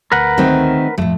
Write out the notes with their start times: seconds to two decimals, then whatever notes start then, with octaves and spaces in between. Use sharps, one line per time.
0.12 D2 A#4 B4 F#5
0.38 D#3 A3 C4
0.98 F2 A2 A3